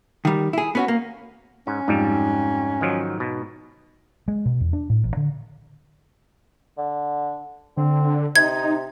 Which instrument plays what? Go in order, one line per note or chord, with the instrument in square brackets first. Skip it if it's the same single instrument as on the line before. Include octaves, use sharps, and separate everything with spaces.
[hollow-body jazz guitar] D#3 G3
E4 G#4
B3 C#4 F#4
A#3
[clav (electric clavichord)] G#2 [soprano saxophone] C#4
[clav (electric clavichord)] F2 G3 [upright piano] G#2
[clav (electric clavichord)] D#3 F3 F#3
B2
[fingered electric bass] G#3
B2
E2
D4
A2
A1
D3
[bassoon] D3
[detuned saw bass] D3 [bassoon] C4
[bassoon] C3 [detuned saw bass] D#4 [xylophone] G#6